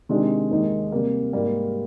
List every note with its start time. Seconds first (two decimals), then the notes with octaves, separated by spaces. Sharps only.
0.09 C3 D#3 G#3 D4
0.51 D#2 D#3 G#3 D#4
0.92 C3 G3 A#3
1.33 G#2 G3 A#3